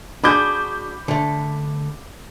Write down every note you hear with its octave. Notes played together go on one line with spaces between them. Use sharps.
D4 F#4 G#4 B5 D6 G6
D3 A3